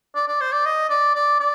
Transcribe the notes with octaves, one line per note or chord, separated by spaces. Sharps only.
D5
D5
C5
D5
D#5
D5
D5
D5